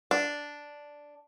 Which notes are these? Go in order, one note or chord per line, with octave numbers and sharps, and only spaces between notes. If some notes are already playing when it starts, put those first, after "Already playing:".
D4